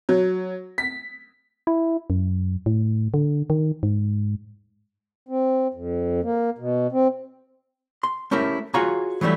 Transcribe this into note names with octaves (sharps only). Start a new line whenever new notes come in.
F#3
B6
E4
F#2
A2
D3
D#3
G#2
C4
F2
A#3
B2
C4
C6
A3 C#4 E4 G4 A#4
F4 F#4 G#4 C#5 G#5 A#5
E3 F#3 G3 A3 E4